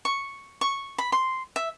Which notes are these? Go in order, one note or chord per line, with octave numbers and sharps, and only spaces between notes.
C#6
C#6
B5
C6
E5